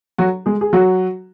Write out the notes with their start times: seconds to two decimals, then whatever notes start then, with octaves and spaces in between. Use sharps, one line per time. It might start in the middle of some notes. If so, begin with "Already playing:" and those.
0.18 F#3 F#4
0.46 G#3 G#4
0.61 G#4
0.73 F#3 F#4